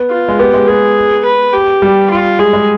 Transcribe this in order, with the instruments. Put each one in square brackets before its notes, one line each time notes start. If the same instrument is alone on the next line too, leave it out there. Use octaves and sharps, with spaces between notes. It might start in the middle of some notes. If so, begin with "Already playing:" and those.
Already playing: [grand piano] B3
[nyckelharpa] F4
[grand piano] G#3
[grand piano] B3 [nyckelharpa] G4
[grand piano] G#3
[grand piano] B3 [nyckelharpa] G#4
[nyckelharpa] B4
G4
[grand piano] G3
[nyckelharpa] F4
[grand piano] G#3 [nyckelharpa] G#4
[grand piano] G#3